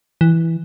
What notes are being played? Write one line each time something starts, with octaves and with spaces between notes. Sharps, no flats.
E3